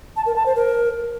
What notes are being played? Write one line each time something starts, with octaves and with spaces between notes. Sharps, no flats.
A5
A#4
A5
C5
A#4